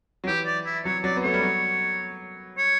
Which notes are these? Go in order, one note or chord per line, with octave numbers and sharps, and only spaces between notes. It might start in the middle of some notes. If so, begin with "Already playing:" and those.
F#3
E3 G4
D5
E4
F#3 C#5
F#3 D5
B3
A3 C#5
G3
F#3
C#5